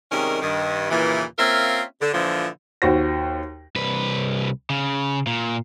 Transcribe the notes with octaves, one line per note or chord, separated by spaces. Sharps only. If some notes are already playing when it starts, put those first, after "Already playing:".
C3 D#3 G3 G#3 C#4 A#4
G2 D#3
D#2 A#2 C#3 E3
A#3 C4 C#4 F4 A#4 E5
D3
A#2 D3 E3 F3
D#2 F#4 C5 A#6
C2 B4
C#3
A#2